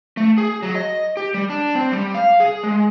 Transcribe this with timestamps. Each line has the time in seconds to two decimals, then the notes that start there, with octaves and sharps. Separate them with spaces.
0.17 A3
0.38 G#4
0.63 F#3
0.75 D#5
1.17 G4
1.34 G3
1.50 D4
1.75 C4
1.92 G3
2.14 F5
2.40 G#4
2.63 G#3